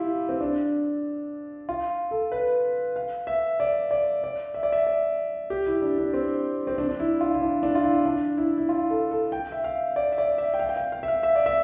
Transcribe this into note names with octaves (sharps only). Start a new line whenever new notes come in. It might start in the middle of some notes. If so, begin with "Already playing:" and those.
Already playing: E4 F4 G4
C4
D4
F4
A4
B4
F5
E5
D5
D5
D5
E5
D5
E5
D5
G4
E4
D4
D4
C4
C4
D4
D4
E4
F4
E4
D4
D4
F4
E4
D4
E4
E4
F4
A4
A4
G5
E5
F5
D5
E5
D5
E5
G5
F5
G5
F5
F5
E5
F5
E5
D5
E5